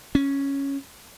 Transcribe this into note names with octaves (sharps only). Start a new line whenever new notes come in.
C#4